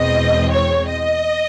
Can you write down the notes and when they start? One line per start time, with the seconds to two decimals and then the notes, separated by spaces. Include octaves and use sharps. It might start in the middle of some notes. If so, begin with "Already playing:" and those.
Already playing: E2 B2 G#3 C4 D#5
0.50 C#5
0.88 D#5